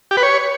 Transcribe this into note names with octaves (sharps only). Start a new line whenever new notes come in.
G4
B4
C#5